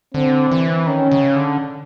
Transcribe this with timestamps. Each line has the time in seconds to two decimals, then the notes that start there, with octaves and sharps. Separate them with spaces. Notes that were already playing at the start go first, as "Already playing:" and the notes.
0.14 D3 C4
0.51 E3
0.87 D#3 C#4
1.12 C#3
1.36 D3